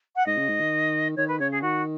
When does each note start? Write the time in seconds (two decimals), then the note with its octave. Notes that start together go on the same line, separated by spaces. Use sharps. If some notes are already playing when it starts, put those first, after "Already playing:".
0.16 F#5
0.26 G#2 D#5
0.37 C#3
0.48 G#2
0.60 D#3
1.16 D#3 C#5
1.28 B4
1.40 C#3 C#5
1.51 G#4
1.62 D#3 F#4